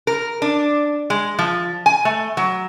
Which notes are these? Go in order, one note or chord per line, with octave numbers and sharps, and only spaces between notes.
A#4
D4
G#3
F3
G#5
A3
F#3